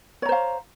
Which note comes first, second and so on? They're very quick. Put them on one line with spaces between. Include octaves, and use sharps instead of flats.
C#5 A#5 C5 F5